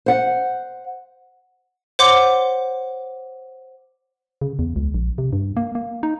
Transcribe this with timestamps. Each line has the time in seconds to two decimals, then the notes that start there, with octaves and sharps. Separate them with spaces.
0.06 C5 F#5
1.99 C5 C#5 F#5 C6 D6
4.41 C#3
4.59 E2
4.76 C#2
4.94 A#1
5.18 C3
5.33 G2
5.57 A#3
5.75 A#3
6.03 D#4